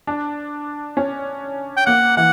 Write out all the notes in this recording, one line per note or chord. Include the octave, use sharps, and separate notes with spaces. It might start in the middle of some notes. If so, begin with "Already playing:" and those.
D4
C#4
G5
A#3 F#5
E3 F#5